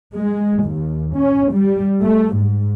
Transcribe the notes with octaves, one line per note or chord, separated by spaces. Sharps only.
G#3
D#2
C#4
G3
A3
G#2